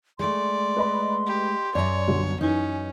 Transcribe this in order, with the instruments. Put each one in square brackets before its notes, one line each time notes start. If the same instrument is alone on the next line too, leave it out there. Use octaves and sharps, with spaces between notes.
[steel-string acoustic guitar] G#3 A3 [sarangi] D5 [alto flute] C6
[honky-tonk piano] B4 D#5 B5
[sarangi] G4
[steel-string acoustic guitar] F#2 A#5 [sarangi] C#5 [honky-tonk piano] D5 E5
[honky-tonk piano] B1 D3 G3
[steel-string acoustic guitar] F#2 D#4 [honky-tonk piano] E3 [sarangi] C#4